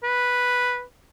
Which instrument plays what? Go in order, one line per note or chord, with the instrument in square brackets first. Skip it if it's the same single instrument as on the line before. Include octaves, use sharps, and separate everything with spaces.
[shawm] B4